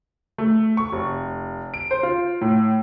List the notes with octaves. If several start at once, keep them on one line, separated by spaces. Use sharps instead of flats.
A3
C#6
F1
D7
C5
F4
A2